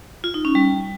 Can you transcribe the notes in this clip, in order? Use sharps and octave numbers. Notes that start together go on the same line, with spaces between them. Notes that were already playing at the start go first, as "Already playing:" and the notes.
F4
D#4
C#4
G3